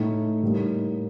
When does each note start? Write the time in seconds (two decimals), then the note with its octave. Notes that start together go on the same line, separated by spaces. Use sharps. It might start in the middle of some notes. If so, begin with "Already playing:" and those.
Already playing: A2 A3 D#4
0.43 A2 G3 A#3 D#4